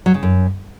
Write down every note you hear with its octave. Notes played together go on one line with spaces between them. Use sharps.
F#3
C#3
F#2